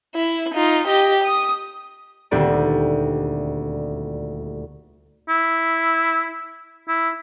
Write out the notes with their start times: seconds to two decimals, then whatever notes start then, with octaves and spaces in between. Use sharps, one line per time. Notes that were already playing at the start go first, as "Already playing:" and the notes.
0.15 E4
0.54 D#4 F4
0.87 G4 D#5
1.24 D#6
2.31 D#1 D2 C4 G4 D5 A5
5.29 E4
6.88 E4